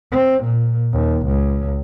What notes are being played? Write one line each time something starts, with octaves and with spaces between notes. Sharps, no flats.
C4
A#2
D#2
C#2